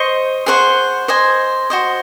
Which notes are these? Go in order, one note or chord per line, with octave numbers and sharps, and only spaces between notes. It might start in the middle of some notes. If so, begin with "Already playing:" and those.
Already playing: C5 D#5 C#6
G#4 C5 F#5 C#6
C5 D#5 G#5
F#4 C5 D#5